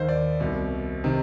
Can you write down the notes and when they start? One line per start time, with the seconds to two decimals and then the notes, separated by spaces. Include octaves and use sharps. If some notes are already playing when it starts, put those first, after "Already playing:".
Already playing: D#2 D#3 C5
0.09 D5
0.40 C2 B2
1.04 C3 D#3